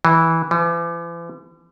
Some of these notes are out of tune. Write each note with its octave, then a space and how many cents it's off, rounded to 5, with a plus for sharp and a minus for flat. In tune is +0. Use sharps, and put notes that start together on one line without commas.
E3 -10
E3 +45